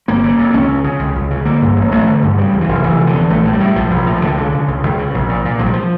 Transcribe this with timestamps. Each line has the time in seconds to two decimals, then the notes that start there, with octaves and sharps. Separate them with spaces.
0.08 G1 A#3
0.24 C#3
0.39 F2
0.53 C#2 C#4
0.69 C#3
0.84 C#3
0.99 C#2
1.16 C#2
1.31 C#3
1.45 D3 A#3
1.62 G2
1.76 A1
1.91 A1 A3
2.07 D3
2.22 G2
2.38 C#3 G3
2.53 E2
2.61 E3
2.68 F1
2.83 F1 E3
3.00 C#3
3.07 D3
3.14 E2
3.29 A#1 A3
3.45 A2
3.53 G3
3.60 A2
3.76 A#1 F3
3.91 A#1
4.06 A2
4.21 C#2 D3
4.38 C#3
4.52 C#3
4.68 C#2
4.83 C#2
4.98 C#3
5.14 A#1
5.28 A#2
5.45 A#2
5.59 A#1 F3
5.66 G3
5.73 F3